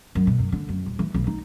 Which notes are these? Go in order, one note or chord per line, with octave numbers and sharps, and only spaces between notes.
F#2
B2
F#2
D3
F#2
D#1
E3
B1
D#4